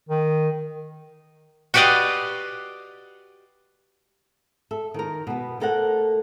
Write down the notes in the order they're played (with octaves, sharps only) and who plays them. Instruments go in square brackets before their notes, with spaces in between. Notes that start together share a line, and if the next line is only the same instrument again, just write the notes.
[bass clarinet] D#3
[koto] F#4 G4 B4 D5 D#5 F5
[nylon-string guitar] A4 E5
D#3 A#4
B2 B3
A3 A#3 A4 A#4 C5 F#5